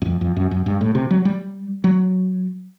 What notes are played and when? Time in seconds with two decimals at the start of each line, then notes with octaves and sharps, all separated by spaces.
0.02 F#2
0.06 F2
0.21 F2
0.37 F#2
0.51 F#2
0.66 G2
0.81 A2
0.95 C3
1.11 F#3
1.25 G3
1.84 F#3